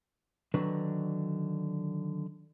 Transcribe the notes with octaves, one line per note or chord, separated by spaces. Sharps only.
D3 D#3 F#3 D4 B4